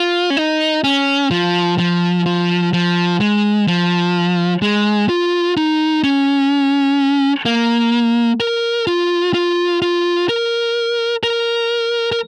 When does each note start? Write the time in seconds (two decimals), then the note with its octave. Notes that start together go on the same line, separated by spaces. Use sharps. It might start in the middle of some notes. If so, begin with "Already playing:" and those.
Already playing: F4
0.30 C#4
0.37 D#4
0.84 C#4
1.31 F3
1.78 F3
2.26 F3
2.73 F3
3.20 G#3
3.67 F3
4.62 G#3
5.09 F4
5.57 D#4
6.04 C#4
7.45 A#3
8.40 A#4
8.87 F4
9.34 F4
9.82 F4
10.29 A#4
11.23 A#4
12.12 A#4